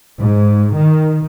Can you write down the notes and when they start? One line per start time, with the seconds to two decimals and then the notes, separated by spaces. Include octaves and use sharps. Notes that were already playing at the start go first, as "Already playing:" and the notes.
0.18 G#2
0.76 D#3